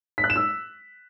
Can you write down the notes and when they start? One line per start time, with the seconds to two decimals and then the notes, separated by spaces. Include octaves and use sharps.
0.18 B6
0.24 F#6
0.30 E7
0.36 E6